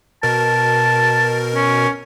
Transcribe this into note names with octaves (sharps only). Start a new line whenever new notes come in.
B2 A#4 A5
C#4